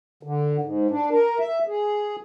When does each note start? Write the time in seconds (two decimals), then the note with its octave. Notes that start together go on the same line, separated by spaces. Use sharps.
0.23 D3
0.61 G#2
0.90 D4
1.11 A#4
1.39 E5
1.67 G#4